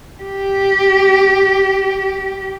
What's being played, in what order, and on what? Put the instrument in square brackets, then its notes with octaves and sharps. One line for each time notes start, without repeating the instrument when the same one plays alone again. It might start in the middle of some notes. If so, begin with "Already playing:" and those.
[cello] G4